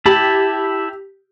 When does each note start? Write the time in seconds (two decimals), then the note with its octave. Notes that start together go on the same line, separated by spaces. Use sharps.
0.06 E4 G4 A5 B5